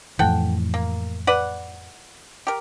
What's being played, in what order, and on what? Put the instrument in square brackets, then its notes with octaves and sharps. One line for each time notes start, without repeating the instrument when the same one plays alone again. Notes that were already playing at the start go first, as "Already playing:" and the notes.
[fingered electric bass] F2 A2 E3 [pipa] A4 F#5 G5
[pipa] A#3
B4 D5 F#5
G4 A#4